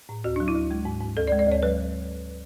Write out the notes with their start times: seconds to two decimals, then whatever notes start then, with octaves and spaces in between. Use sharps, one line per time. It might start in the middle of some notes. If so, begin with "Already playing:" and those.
0.09 A2
0.24 D2 F#4
0.36 F#3 D4
0.48 E4
0.55 D2
0.71 G#3
0.85 G#2
1.01 G#2
1.17 D2 A4
1.27 D5
1.32 G#3
1.39 D5
1.47 D2 C#5
1.63 F#3 B4